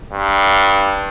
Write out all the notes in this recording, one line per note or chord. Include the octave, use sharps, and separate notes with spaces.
G2